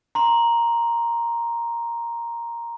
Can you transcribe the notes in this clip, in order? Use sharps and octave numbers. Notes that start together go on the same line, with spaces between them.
A#5 C6